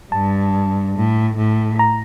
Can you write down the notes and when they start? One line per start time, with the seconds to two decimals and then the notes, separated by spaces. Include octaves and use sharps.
0.12 G2 A5
0.95 A2
1.37 A2
1.79 A#5